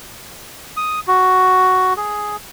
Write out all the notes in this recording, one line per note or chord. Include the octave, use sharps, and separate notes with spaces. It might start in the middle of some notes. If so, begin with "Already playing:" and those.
D#6
F#4
G#4